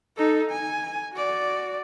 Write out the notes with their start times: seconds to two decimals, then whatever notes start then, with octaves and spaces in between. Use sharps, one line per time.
0.17 D#4 A4
0.51 G#5
1.14 F#4 D5